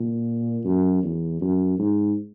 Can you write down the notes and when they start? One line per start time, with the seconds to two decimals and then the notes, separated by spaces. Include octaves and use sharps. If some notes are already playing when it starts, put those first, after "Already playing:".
Already playing: A#2
0.65 F#2
1.03 E2
1.41 F#2
1.78 G#2